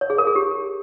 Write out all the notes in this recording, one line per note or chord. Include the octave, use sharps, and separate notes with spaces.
C#5
G#4
A#4
G#4
G4